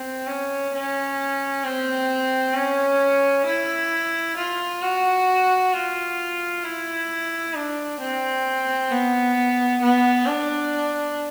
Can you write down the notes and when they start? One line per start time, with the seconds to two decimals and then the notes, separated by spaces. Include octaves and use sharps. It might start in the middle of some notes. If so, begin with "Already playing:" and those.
Already playing: C4
0.27 C#4
0.74 C#4
1.64 C4
2.54 C#4
3.46 E4
4.37 F4
4.82 F#4
5.72 F4
6.63 E4
7.54 D4
8.00 C4
8.91 B3
9.82 B3
10.26 D4